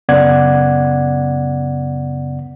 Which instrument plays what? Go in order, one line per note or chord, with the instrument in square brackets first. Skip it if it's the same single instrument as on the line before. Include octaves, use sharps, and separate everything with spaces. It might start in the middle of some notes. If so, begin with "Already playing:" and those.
[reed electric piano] F#2 C#3 B3 D5 F#5 G#6